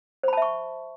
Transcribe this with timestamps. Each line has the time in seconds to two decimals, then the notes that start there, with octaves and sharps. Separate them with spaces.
0.23 C5
0.28 B5
0.33 A5
0.37 E5
0.42 C#6